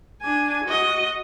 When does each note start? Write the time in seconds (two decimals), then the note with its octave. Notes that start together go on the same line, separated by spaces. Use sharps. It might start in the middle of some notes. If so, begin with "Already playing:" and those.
0.22 D4 G#5
0.64 F#4 D#5